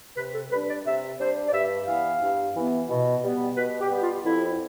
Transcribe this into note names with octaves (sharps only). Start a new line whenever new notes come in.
C3 B4
A4
G3 D4 B4
D5
C3 E5
G3 D4 C5
D5
G2 E5
E3 B3 F5
G2
E3 B3
B2
G3 B3
B2 B4
G4
G3 B3
G4
F4
F2 E4